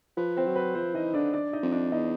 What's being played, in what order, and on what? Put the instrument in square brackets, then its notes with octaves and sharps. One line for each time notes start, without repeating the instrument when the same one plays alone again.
[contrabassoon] F3 [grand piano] B4
[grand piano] C4 C5
[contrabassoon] F#3
[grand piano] B4
[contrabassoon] F3 [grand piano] C4 C5
[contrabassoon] E3 [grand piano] D#4 D#5
[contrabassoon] D3 [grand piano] D4 D5
[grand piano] D4 D5
D#4 D#5
[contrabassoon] F2
[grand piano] D4 D5
[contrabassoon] E2 [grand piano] D#4 D#5